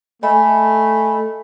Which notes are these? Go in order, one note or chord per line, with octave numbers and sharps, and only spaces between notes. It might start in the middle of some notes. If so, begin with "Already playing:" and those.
A3 D#5 G#5 B5